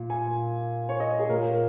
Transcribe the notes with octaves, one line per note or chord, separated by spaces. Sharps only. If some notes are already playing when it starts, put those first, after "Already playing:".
Already playing: A#2
G#5
C#5
D#5
G#4
A#2 A#4